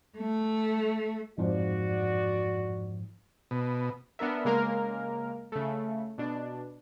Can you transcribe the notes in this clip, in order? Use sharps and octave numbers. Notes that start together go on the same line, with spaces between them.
A3
F2 G#2 F3 F#4 D5
B2
B3 D4 A#4 E5
C#3 G#3 A#3 A#4
C#3 A3
B2 D4